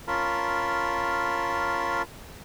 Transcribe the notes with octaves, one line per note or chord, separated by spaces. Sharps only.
C#4 F4 A#4 A5 B5